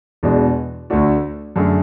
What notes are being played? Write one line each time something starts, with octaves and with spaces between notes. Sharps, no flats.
E2 B2 G#3 D4
D2 D3 A3 D4 F#4
F#2 D3 A3 D4 G#4